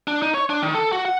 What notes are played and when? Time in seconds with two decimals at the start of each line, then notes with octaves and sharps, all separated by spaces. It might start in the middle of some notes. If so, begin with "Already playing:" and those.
0.08 D4
0.22 D#4
0.34 C#5
0.50 D4
0.62 D#3
0.74 A4
0.92 F#4
1.05 F#5